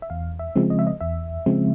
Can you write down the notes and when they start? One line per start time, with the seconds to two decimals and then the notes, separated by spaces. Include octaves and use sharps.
0.02 E5
0.10 E2 F5
0.39 E5
0.56 C#3 F3 G#3 C4
0.70 D#5
0.79 E5
0.87 D#5
1.01 E2 E5
1.46 C#3 F3 G#3 C4